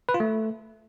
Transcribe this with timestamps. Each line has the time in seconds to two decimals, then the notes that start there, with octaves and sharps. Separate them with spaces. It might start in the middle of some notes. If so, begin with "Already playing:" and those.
0.09 B4
0.14 F4
0.20 A3